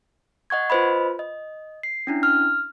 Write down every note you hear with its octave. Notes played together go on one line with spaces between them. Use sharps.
D#5 F#5 C#6 G#6
F4 B4 C5 D#5 B5
D#5
C7
C#4 D4 E4
F6